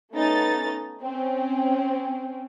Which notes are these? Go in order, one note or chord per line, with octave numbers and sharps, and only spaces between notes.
A3 B3 C#4 D#4 A6
C4 C#4